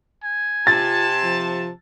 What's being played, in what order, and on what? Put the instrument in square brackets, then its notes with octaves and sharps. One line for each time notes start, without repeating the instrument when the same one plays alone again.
[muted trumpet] G#5
[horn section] C3 A5 [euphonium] F4 [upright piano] A6
[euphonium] F3